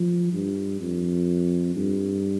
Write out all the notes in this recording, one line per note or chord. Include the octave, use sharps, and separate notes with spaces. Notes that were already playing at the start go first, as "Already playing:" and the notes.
Already playing: F3
G2
F2
G2